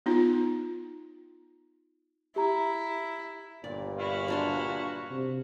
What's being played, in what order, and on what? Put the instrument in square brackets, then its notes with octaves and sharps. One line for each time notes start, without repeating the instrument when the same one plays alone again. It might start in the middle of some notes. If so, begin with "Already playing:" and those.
[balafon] B3 D#4 F4
[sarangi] E4 [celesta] G4 A#5
[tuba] G1 [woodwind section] G2 A#2 [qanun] D5
[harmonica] E4 F#4 F5
[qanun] F#3 D4 C6
[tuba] C3